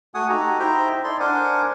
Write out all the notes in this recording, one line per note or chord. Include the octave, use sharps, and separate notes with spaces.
A3 F#4 F#5 G#5 D#6
D#4 F#4 G4 A4 A#5
D#4 E4 C5 E5 G5 A#5
D#4 E4 A4 D5 C6
D4 A#4 C5 F#5 G#5 D6